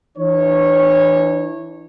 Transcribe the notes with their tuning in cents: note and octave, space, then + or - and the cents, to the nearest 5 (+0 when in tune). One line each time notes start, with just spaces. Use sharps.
E3 +0 D4 +35 C#5 -20